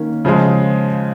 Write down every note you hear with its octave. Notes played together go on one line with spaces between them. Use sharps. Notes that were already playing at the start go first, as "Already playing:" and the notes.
Already playing: D#3 A#3 C#4
C#3 F3 G#3